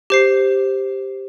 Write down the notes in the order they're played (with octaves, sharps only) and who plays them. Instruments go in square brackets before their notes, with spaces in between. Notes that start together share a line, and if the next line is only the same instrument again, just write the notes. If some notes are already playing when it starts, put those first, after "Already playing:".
[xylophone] G4 C5 C7